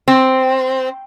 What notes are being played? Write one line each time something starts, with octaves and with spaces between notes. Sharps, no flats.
C4